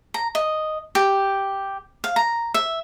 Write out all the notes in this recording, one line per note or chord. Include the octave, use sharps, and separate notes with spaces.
A#5
D#5
G4
F5
A#5
E5